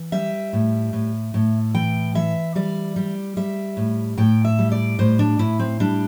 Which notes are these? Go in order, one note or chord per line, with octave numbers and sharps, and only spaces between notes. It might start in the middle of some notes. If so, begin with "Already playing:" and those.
Already playing: E3
G3 E5
A2
A2
A2
E3 G5
E3 E5
G3 D5
G3
G3 E5
A2
A2 G5
E5
G3
D5
A2 C5
D4
A2 E4
C4
G3 D4